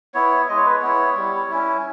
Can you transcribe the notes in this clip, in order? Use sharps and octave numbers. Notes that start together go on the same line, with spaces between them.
B3 E4 C#5
G#3 D#5
C#5
B4
C#5
B3 E4
G3
C#4 E4